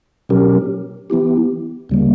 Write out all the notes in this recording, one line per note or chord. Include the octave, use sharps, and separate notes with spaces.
B2 F#3 C#4 G4 A#4
E3 B3 E4 G4
D2 C#3 G3 A#3